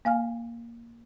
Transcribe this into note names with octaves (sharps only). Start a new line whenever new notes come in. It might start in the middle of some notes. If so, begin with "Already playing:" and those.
A#3 F5 G#5 F6